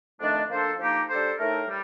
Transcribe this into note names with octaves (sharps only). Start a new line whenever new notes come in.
F2 D#3 A3 D4
F3 A#3 D4 A4 C5
F3 A#3 D#4 G4
G3 D4 A4 C5
A2 A3 D#4 A#4
G3